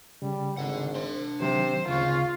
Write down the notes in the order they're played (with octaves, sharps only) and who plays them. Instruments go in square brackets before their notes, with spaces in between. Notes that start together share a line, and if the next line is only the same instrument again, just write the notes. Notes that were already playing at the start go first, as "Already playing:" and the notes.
[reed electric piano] C#3 [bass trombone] G3
[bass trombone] G#1 [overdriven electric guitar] D3 F#5
[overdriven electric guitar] D4 C6 [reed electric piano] C5
[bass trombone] C3 [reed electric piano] D#3 F#3 [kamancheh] C5
[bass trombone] G#1 [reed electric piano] D2 C4 C#6 [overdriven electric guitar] C#3 C#4 [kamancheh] F4